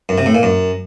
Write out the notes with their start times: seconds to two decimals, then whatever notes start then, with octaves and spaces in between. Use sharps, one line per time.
0.09 F#2
0.18 C3
0.26 A2
0.35 A#2
0.43 F#2